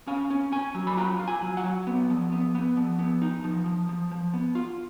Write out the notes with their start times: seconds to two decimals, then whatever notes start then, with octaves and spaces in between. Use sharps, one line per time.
0.07 C#4 F5
0.30 C#4
0.52 C#4 G#5
0.75 F#3
0.87 B5
0.97 F4 A#5
1.20 F4
1.28 G#5
1.42 F#3
1.57 F#5
1.64 F#3
1.87 B3
2.10 F3
2.32 B3
2.55 B3
2.77 F3
2.99 B3
3.22 D#4
3.44 F3
3.66 F3
3.89 F3
4.11 F3
4.33 B3
4.55 F4